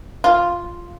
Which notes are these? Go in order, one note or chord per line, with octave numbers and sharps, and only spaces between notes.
F4